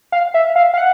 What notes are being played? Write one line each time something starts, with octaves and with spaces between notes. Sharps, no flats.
F5
E5
F5
F5
F#5